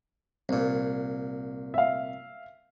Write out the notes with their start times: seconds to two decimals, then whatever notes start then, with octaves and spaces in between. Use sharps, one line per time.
0.49 C2 A#2
1.74 E5 F5